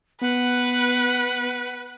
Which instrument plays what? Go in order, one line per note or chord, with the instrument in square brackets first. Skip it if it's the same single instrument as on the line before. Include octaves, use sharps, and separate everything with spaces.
[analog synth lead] B3 [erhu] B4 [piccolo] F#5